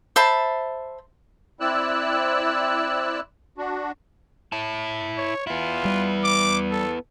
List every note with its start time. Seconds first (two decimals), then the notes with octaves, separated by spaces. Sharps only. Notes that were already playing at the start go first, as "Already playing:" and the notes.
0.16 C5 E5 A5 B5
1.60 C4 E4 D5 E6 F#6
3.58 D4 F#4
4.52 E4 A5
5.17 C#5
5.47 B3 E4 F4
5.85 G3
6.24 D6
6.71 A4